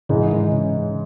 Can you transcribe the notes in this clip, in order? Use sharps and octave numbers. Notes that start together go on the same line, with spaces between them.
G#2 C#3 E3 G#3 D#4
D#3
C#3